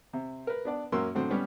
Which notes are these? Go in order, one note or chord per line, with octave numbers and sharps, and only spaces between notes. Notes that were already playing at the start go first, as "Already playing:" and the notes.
C3
A#4 B4
B3 D4 D5
F#2 A#3 C#4 F#4 C6 E6
A2 D3 F#3 C4
G3 B3 C#4